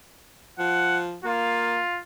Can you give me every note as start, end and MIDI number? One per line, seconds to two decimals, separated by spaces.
0.59 1.18 53
0.59 0.99 78
1.25 1.81 58
1.25 2.00 65